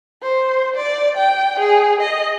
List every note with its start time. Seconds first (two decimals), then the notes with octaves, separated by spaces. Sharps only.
0.23 C5
0.76 D5
1.17 G5
1.59 G#4
2.01 D#5